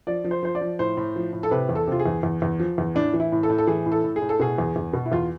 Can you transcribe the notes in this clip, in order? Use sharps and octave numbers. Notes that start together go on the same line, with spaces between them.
F3 D5
F3
C5
F3 C5
D5
F3
A2 C5
A2
F3
A2
A4
C3 B4
E2
A4
C3 F4
G#4
E2
E2
E2
F3
E2
A2 D4
E3
E4
A2
A4
A2
A4
E3 G#4
A2
A4
A2
G#4
A2
A4
B2 G#4
E2
E2
B2
E4
E2 F4